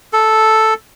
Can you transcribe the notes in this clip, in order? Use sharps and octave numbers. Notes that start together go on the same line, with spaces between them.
A4